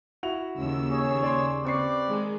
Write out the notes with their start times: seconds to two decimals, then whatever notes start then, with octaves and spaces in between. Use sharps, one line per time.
0.23 E4 F#4 F7
0.57 D#2 C#3 E6
0.91 G#4 C#5
1.23 D5 C6
1.65 C4 G4 B4 D5 C#6 C7
2.07 D#3 G#3